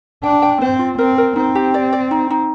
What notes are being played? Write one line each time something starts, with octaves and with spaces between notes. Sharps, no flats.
D4 G5
G5
C4 C5
F4
C4 A#4
A#4
C4 D#4
G4
D5
D5
D#4
D#4